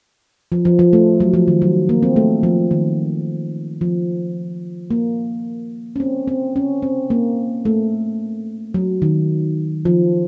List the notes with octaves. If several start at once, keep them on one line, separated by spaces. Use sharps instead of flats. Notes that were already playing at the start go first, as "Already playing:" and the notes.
F3
F3
F3
A3
F#3
F3
D#3
F#3
A#3
C4
A3
F3
D#3
F3
A#3
C#4
C4
C4
C#4
C4
A#3
A3
F#3
D#3
F3